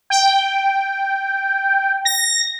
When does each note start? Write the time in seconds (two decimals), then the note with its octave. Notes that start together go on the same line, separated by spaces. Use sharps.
0.10 G5
2.05 A#6